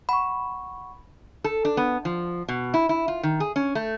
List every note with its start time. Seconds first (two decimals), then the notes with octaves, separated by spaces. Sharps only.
0.09 F#5 B5 C#6
1.44 A4
1.65 D4
1.77 B3
2.05 F3
2.48 B2
2.74 E4
2.89 E4
3.08 F4
3.23 D#3
3.40 G#4
3.56 C#4
3.75 A3